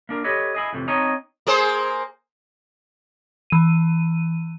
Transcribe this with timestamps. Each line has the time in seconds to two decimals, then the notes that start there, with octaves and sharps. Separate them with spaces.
0.09 A#3 D4 A#4
0.24 G4 A4 B4 C#5 D#5
0.55 E4 G#4 D#5
0.73 F2 A2 C3 E3
0.88 C4 D#4 C#5 D#5 A5 A#5
1.47 A#3 G#4 C5
3.50 E3 D#7